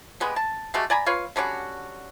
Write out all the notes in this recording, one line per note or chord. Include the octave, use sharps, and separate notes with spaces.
G3 G#3 B3 G4
A5
G#3 A3 F#4 G4
D5 G#5 A#5 B5
F4 B4 C#5 F5
D3 G3 C#4 F#4